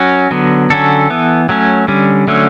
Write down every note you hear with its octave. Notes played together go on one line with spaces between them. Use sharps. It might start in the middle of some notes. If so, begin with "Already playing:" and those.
Already playing: F#3 C#4 F#4
D3 F#3 B3
D3 F#3 C#4 A4
E3 B3
F#3 A3 C#4
D3 G3 C#4
D3 F#3 A3 C#4